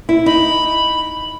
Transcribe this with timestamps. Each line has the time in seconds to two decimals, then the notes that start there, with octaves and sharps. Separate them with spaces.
0.09 E4
0.26 D#4 B5